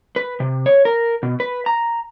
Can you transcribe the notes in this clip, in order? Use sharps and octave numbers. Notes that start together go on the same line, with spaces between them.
B4
C3
C#5
A#4
B2
B4
A#5